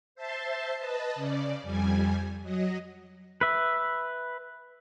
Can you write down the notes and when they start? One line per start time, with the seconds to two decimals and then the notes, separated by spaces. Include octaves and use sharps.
0.15 C5 E5 A5 C6
0.78 B4 D#5 A5
1.15 C#3 D5
1.63 F2 G3 G#5
2.42 F#3 D#5
3.41 B4 E5